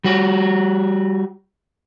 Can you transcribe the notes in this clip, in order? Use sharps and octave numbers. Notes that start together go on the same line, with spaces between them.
G3 F#4